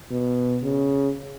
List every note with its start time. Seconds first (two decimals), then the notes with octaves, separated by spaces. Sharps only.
0.11 B2
0.63 C#3